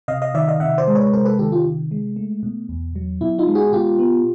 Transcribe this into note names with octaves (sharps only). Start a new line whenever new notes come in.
C3 D#5 F5
D#5 F5
D#3 D5 E5
D#5 F5
C3 E5 F#5
C5 D5
G#3
B4 C#5
C3 A#4 C5
A4 B4
D#3 G4 A4
F4 G4
C3
G#3
A3
B2
E2
F#3
B2 E4
D#4 F4
G#3
F#4 G#4
B2 F4 G4
B3